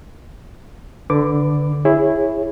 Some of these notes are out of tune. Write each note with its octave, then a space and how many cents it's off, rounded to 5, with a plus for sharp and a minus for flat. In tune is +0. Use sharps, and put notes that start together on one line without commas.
D3 +0 B4 +15 D6 +0
E4 +0 G#4 -20 C#5 -20